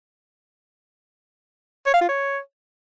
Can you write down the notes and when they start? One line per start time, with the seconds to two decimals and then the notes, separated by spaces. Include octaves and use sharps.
1.86 C#5
1.94 F5
2.01 F4
2.09 C#5